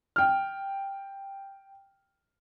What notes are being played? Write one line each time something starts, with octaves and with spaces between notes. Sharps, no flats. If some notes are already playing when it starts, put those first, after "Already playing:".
G5 F6